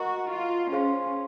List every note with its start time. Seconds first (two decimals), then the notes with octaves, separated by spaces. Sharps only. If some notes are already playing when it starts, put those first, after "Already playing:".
Already playing: F#4 A#4 D#5 A#5 C#6
0.30 F4
0.71 C#4 G#4 C5 F5 C6